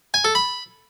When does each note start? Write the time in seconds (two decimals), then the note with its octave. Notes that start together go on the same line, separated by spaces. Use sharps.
0.14 G#5
0.25 A4
0.35 B5